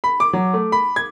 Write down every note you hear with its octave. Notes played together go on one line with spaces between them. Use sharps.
B5
D6
F#3
A3
B5
G#6